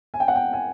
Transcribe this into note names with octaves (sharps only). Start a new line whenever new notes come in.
G#5
G5
F#5
G5
G#5